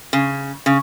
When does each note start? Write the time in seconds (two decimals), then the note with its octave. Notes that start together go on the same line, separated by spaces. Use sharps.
0.13 C#3
0.66 C#3